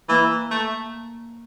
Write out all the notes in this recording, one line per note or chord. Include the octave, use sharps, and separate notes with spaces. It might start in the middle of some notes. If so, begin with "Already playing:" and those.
E3 A#3
A3